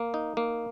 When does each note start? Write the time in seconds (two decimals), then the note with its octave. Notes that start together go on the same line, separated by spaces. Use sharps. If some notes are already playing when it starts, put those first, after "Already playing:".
Already playing: A#3
0.14 D#4
0.37 A#3